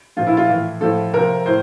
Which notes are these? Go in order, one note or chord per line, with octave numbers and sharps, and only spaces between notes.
A#2 F3 F4
E4
F4
A2 E3
A2 F3 A4
C3 F3 A#4
A2 C5